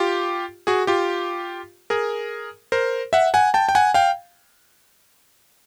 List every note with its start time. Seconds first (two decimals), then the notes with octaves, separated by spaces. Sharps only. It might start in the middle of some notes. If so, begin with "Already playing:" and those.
Already playing: F4 G4
0.67 F#4 G#4
0.87 F4 G4
1.90 G#4 A#4
2.72 A#4 C5
3.13 E5 F#5
3.34 F#5 G#5
3.54 G5 A5
3.69 G5
3.75 F#5 G#5
3.94 F5 G5